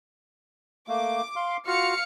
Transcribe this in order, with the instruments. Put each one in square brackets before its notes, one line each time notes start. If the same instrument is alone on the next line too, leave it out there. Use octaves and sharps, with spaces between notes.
[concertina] A3 A#3 [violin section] D6
[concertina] F5 C6
[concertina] F4 F#4 [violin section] F5 F6 C#7